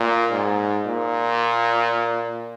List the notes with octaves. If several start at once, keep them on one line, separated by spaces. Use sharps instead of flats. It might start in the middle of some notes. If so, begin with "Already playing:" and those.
Already playing: A#2
G#2
A#2